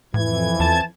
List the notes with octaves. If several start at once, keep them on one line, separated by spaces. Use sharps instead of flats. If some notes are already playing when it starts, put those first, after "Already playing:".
F2 A2 E3 G#6
E2 A5